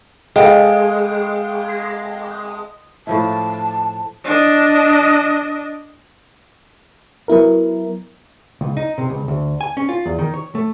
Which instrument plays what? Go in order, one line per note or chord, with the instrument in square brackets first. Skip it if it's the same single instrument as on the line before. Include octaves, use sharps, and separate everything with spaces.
[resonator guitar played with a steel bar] G#3 [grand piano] A4 F5 G5
[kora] A2 F3 E4 [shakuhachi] A5
[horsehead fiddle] D4 D#5
[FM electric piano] F#3 B3 E4 A#4
[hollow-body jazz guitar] C#2
D#4
C3
C#2
D2
G#5
C#4
F4
E2
D#3
C#5
A3